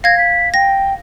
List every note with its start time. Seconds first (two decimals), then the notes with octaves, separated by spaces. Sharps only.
0.04 F5 G#6 A#6
0.18 B6
0.54 G5 A#6